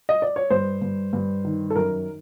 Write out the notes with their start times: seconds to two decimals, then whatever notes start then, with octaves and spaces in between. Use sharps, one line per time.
0.09 D#5
0.22 D5
0.36 C#5
0.50 G2 C5
0.81 G2
1.13 G2
1.45 D#3
1.70 A4
1.76 F#2 A#4